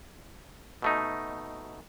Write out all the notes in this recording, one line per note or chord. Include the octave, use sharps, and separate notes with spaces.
B2 A3 D#4